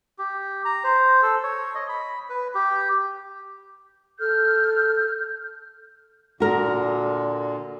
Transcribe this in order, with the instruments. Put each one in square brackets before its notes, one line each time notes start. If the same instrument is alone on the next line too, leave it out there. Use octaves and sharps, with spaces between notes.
[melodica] G4
A#5
C5
A4
C#5
D#5
B5
B4
G4
[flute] A4 [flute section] F6 [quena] G6
[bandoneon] A#2 D3 [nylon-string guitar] F#4 A#4